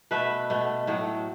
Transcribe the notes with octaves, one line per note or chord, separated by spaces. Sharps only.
B2 A3 B4 E5
B2 A3
A2 F#3 A3